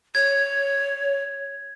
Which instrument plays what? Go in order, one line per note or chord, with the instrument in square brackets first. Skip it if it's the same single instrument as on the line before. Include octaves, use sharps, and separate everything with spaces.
[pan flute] C#5 [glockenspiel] G#6